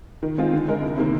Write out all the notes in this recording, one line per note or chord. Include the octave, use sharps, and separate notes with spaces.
D#3
G#3 C4 F4 G#4
D3
G#3 D#4 A#4
C2
C3 D#3 A#3